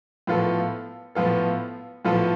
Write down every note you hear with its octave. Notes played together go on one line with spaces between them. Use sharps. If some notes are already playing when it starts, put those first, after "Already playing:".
A2 F3 B3 F4 A4
A2 F3 B3 F4 A4
A2 F3 B3 F4 A4